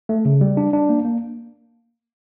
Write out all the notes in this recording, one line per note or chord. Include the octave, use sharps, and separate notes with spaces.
A3
C#3
G3
D4
D4
A#3
A#3